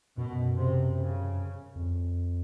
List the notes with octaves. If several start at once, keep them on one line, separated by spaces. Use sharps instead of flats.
F#2 B2
C3
C#3
F2